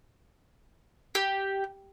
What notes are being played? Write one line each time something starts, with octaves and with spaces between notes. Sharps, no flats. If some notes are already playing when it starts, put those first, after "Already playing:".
G4